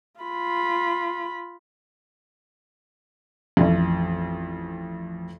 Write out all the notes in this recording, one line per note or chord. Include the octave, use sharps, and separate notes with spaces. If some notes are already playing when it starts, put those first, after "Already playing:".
F4 B5
A1 F2